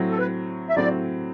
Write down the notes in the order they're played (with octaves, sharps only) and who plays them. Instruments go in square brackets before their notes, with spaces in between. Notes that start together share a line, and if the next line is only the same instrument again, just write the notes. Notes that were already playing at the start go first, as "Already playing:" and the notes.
Already playing: [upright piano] A2 F#3 C4
[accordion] A4
B4
E5
[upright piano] A2 F#3 C4 [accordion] D5